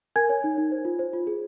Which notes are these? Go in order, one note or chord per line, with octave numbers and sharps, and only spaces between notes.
A#4 G#5 G#6
C#5
D#4
D#4
C5
F4
C5
F4
G#4